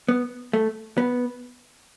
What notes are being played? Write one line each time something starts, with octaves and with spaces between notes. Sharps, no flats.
B3
A3
B3